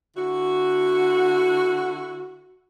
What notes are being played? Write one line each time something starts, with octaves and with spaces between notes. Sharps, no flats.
D3 E4 F#4